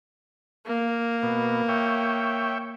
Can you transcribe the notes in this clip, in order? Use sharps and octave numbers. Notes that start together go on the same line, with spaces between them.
A#3
B2
C#5 E5 G5